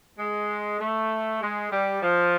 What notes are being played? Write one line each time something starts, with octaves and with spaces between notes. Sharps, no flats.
G#3
A3
G#3
G3
F3